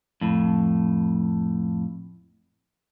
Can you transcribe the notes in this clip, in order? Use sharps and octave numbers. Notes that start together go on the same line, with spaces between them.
F2 A2